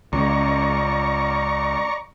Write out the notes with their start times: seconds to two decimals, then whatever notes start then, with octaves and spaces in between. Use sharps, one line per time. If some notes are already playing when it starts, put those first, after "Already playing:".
0.13 C#2 D5 A#5 C#6